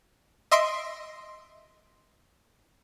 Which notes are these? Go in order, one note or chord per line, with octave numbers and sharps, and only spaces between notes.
D#5 E5 C6 A#6 C7 D7